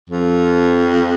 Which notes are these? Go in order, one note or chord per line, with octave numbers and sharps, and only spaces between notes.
F2